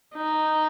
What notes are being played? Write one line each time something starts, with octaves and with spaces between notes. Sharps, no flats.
D#4